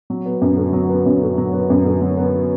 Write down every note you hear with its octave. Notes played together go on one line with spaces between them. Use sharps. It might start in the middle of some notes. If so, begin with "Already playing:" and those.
F#3
B3
F#2
D3
F#3
B3
F#2
D3
F#3
B3
F#2
D3
F#3
B3